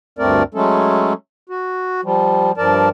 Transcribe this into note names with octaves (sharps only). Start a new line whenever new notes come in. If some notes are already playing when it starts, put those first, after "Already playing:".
D2 G2 A3 C4 A#4 D5
F#3 G#3 A3 C#4 A4
F#4
F3 G3
G2 F3 A#4 D5 A5